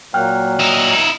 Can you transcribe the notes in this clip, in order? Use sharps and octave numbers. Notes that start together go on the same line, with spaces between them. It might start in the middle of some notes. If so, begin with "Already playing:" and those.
A#2 F#3 A#3 G5 F6 F#6
D#4 E4